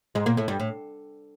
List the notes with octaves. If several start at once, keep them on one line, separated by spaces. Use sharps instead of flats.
G#2 G#3
A#2 A#3
A2 A3
G2 G3
A2